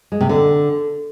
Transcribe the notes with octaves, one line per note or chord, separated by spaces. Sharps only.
G#3
C3
D3